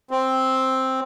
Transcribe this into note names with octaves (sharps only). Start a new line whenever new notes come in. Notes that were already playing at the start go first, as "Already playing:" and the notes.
C4